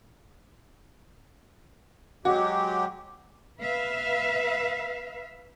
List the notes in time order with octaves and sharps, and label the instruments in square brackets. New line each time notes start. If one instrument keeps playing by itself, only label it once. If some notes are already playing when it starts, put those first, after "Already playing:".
[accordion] F#3 G#3 G4 [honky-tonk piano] F#4
[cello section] B4 E5 F5